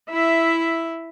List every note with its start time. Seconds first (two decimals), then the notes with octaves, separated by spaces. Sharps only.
0.10 E4 E5